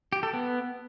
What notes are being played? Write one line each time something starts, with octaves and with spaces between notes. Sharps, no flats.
G4
A4
B3